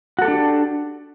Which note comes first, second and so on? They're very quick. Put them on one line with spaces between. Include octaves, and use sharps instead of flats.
F#4 A4 G4 D4